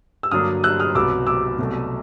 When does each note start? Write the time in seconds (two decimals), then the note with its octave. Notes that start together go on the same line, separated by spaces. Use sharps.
0.23 E6
0.31 G2 D3 F#3 A#3 D4 D#6 F6
0.64 E6 F#6
0.80 D#6 F6
0.95 C2 B2 F#3 B3 D6 E6
1.27 D6 E6
1.59 C2 B2 F#3 A3